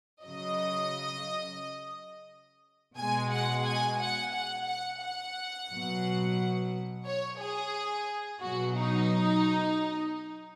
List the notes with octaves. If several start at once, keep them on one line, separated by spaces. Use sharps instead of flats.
C#3 F#3 D#5
B2 G#3 G#5
F#5
G#5
F#5
F#5
F#5
F#5
B2 F#3
C#5
G#4
B2 F#3 F#4
D#4